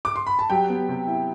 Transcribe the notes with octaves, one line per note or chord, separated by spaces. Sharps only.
D6
C6
B5
A5
F#3 G4 G5
B3
C3
E4